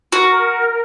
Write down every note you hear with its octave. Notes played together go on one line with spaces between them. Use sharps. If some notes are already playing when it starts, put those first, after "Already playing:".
F#4 A#4